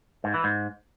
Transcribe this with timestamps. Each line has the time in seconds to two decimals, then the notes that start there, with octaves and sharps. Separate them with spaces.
0.24 G#2
0.34 E3
0.44 G#2